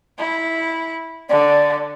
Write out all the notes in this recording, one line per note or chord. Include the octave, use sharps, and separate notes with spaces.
E4
D3 D5